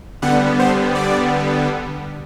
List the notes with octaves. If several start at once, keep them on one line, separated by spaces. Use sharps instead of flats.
D3 G3 B3 F#5
C5
D5